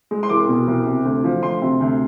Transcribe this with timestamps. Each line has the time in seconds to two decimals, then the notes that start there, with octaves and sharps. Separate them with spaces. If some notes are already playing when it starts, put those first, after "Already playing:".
0.11 G#3
0.23 C6
0.29 C2 D6
0.49 B2
0.68 C2
0.86 C3
1.05 D2
1.24 F3
1.43 D2 C6
1.61 C3
1.81 D2